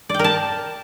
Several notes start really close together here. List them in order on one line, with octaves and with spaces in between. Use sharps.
D5 G5 A#4 A5